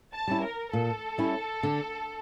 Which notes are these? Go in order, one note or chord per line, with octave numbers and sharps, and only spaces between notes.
A5
G3 C#4 E4
A#4
A#2 A4
G3 C#4 E4
D3